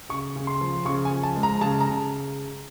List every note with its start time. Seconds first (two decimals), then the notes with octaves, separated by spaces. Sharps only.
0.09 C#3 C#6
0.36 C#3
0.47 C6
0.61 F3
0.85 C#3 C#6
1.05 G#5
1.11 F3
1.23 A5
1.37 G#3
1.43 A#5
1.61 C#3 A5
1.80 A#5
1.87 C#3